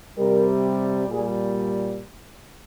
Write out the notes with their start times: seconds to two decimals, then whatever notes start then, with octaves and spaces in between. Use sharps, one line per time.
0.17 C3 G3 A#4
1.09 A#2 G3 G#4